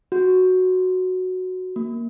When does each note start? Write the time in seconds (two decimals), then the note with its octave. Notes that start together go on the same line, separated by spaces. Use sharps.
0.12 F#4
1.76 A#3